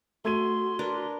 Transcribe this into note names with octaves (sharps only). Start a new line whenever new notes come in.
A3 F#4 C6 G#6 D#7
D4 A#4 B4